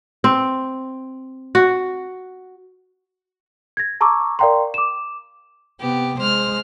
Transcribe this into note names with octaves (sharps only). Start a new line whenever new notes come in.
C4
F#4
G#6 A#6
A5 A#5 C#6 D6 E6
A#4 D5 F5 G5 A#5 C6
D6 E7
C3 B3 G4
G#3 C5 F6